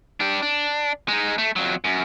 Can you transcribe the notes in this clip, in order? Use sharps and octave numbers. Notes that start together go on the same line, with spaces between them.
D4 G4
D4
G#3 D#4
A3
F2 F#3
F#2